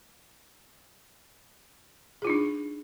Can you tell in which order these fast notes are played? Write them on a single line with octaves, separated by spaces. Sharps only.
G#4 F4 D#4 D4